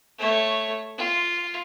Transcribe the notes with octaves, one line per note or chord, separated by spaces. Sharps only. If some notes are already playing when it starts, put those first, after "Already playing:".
A3 C#5
F4